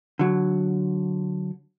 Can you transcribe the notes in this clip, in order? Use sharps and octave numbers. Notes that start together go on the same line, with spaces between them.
D3 F#3